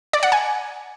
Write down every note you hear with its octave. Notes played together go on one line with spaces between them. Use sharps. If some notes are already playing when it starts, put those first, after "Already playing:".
D5
F#5
G#5